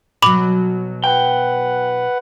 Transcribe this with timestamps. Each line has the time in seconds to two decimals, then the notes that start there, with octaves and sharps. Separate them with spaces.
0.22 B2 F#3 B5 D6 F#7
1.04 B4 F#5 G5